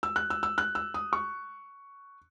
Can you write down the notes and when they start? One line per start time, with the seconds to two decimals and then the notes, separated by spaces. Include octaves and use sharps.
0.03 E6
0.16 F#6
0.30 E6
0.43 E6
0.58 F#6
0.75 E6
0.94 D#6
1.13 C#6